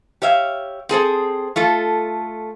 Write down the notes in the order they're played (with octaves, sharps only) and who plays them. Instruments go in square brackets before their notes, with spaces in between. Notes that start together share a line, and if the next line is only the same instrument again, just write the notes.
[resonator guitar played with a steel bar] G4 C#5 E5 F5
C4 G#4 A4 C5
A3 F4 A4